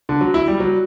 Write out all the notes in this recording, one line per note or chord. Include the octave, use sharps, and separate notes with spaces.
D3
F#3
E4
G3
F#3